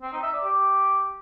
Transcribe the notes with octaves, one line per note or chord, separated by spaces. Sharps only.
C4
D#4
E5
D5
G4